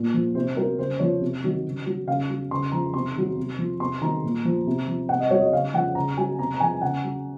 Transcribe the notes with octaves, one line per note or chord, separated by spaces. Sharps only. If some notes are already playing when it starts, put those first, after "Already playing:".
Already playing: A#2
F3
C3 C5
F#3 A#4
C#3 C5
F3 C#5
C3
D#3 F#3
C#3
F#3
C#3 F5
F#3
C#3 C6
F3 A#5
C3 C6
D#3 F#3
C3
F3
C3 C6
D#3 F#3 A#5
A#2
F3
C3
F3
C3 F#5
D#5
F#3 C#5
D#5
C#3 F5
F3 F#5
C#3 A#5
F#3 G#5
C3 A#5
A#5
F3 G#5
C#3 F#5
F#3